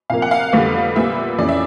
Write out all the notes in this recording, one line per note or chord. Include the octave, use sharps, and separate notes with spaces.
C3 F3 A#3 F5
F#5
F5
F2 D3 G3 B3
A#2 G3 B3 E5
F2 C#3 E3 D5
E5